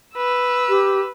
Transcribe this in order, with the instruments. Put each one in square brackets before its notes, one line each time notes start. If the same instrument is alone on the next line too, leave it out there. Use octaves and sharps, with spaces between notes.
[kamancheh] B4 E6
[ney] G4